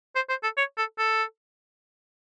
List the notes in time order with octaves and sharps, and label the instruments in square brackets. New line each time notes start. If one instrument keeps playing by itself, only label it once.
[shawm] C5
C5
A4
C#5
A4
A4